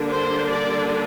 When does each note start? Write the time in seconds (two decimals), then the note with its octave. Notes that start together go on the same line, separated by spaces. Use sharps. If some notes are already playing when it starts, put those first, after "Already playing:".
Already playing: D3 G3 A#3 D4
0.09 C5
0.51 D5